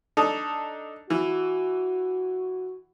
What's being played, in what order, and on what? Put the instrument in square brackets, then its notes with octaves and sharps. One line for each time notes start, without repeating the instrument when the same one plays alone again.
[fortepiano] D4 D#4 A4
[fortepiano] E3 [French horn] F#4